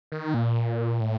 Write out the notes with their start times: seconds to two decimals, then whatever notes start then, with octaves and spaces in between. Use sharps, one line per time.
0.12 D#3
0.34 A#2
1.01 A2